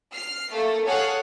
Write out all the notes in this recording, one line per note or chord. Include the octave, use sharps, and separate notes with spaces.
F6 C7
A3 A#3 A4
G#4 A4 C#5 F5 F#5